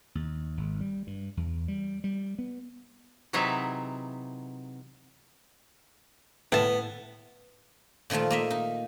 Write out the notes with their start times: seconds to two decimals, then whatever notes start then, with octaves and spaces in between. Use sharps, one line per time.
0.15 D#2
0.57 G#1
0.80 G3
1.07 G2
1.37 E2
1.68 G3
2.04 G3
2.38 B3
3.33 C3 E3 F#3 D#4 G#4 E5
6.52 A2 B3 A5
8.10 A#2 D#3 F3 A3 F4
8.31 A#3 D#5 E5
8.50 D#4